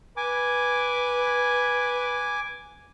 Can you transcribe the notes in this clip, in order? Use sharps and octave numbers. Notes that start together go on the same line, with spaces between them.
B4 G#5 D6